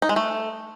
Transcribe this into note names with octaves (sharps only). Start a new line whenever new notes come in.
D#4
G#3
A3